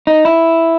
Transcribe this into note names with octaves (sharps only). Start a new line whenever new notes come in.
D#4
E4